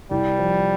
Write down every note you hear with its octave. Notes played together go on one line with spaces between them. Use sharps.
C2 G3
F3